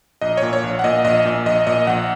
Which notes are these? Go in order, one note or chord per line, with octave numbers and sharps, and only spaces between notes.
A#1 D#5
A#2 C#5
C#5
A#1
F#5
A#2 D#5
A#1 D#5
A#2
A#1 D#5
A#2 D#5
A#1 F#5